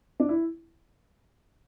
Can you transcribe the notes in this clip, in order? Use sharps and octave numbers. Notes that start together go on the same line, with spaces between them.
D4
E4